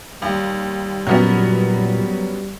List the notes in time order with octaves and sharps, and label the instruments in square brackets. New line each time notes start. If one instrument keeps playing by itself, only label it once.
[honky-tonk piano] D#2 [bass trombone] G3
[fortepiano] F#2 [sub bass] A#2 [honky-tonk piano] F#3 B3 C#4